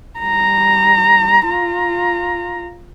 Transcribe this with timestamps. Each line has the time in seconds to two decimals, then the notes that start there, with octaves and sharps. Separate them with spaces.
0.20 G3 A#5
1.47 F4 A#5